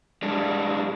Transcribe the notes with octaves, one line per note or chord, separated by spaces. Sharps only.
G3 G#3 D4